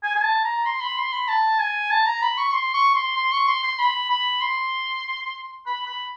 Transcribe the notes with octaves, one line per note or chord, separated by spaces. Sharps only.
G#5
G#5
A5
A#5
C6
B5
C6
B5
A5
G#5
A5
A#5
B5
C#6
C6
C#6
C6
C6
C#6
C6
C6
B5
B5
C6
B5
B5